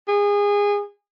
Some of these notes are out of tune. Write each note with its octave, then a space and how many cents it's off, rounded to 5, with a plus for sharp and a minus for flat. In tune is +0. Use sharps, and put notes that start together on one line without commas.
G#4 -25